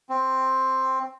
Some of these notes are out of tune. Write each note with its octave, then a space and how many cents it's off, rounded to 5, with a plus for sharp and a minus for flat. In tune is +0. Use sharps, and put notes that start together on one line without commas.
C4 +5